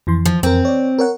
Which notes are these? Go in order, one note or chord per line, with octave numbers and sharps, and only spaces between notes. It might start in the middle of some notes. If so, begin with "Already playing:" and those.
F2 E3 C6
F3
F2 C4 A#4
C#5 D5
A#4 C#5 F#5